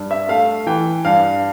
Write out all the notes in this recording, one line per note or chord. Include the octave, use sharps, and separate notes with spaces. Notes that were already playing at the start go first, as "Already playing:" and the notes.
Already playing: G2
E5
A3 F5
E3 G5
G2 F5